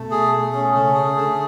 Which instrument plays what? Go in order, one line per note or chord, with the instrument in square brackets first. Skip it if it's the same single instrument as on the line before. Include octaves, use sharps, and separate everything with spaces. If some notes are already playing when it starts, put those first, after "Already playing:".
Already playing: [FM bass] B2 [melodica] A3
[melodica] G#4
A3
C#4
[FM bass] C#3 [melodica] A3
[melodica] G#4
[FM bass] D3 [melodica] A3